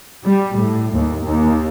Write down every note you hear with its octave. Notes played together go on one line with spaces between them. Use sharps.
G3
A2
D#2
D#2